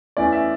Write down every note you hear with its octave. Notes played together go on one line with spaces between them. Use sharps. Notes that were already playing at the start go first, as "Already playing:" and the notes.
E2 E3 A3 C#4 D5
E5